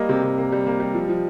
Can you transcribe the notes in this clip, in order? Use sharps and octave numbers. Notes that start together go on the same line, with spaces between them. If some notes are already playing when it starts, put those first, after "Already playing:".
Already playing: G3 A#3 D#5
C3
C3
A#3
G3
A#3
G3
F3
F3